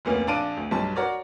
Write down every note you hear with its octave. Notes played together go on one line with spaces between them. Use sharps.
F1 D2 A#3 C#4
A#1 D4 F5 A5 D7 D#7
D2
B1 G2 F#3 A5
F#4 A#4 C#5 D5